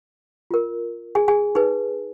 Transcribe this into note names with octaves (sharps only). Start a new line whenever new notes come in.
F4 A#4
G#4 G#5
G#4 G#5
D#4 G#4 B4